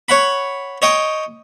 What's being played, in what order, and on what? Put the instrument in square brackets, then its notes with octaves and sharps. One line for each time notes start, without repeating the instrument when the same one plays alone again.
[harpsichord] C#5 F#5 B5
C#5 D#5 G5